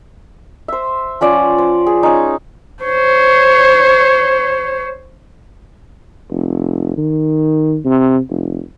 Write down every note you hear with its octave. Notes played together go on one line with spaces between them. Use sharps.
C5 E5
F3 C#4 D5 F#5
C5
G#4
C#4 D#4
C5 C#5
F1
D#3
C3
F1